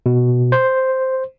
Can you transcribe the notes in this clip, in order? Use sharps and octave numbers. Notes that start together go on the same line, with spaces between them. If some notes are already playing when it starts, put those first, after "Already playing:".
B2
C5